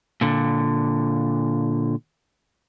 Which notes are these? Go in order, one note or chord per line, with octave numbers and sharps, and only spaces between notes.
A#2 D3